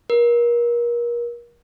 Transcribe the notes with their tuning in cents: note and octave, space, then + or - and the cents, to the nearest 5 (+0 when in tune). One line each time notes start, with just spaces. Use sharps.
A#4 +30